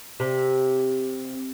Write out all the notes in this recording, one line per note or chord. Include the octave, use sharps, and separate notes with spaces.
C3